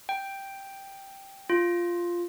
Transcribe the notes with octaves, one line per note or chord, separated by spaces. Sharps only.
G5
F4